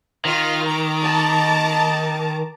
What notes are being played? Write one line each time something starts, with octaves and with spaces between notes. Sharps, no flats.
D#3 F4 F6
A#5 D6
A5